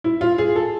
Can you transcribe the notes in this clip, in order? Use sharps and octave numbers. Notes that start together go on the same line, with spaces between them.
E4
F4
G#4
A4